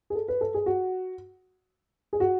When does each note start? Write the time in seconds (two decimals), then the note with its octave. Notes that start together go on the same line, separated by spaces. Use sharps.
0.10 G#4
0.15 A4
0.28 B4
0.41 A4
0.54 G#4
0.66 F#4
2.13 G#4
2.20 F#4